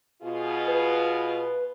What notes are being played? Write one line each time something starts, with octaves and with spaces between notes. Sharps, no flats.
B2 F4 G#4
B4